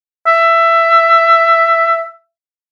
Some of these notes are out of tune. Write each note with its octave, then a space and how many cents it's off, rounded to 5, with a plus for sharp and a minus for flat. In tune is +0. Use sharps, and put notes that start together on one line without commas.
E5 +15